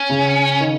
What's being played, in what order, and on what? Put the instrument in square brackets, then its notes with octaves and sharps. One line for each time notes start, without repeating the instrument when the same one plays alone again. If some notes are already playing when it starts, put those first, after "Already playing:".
Already playing: [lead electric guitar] C#4
[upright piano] C#3
D#3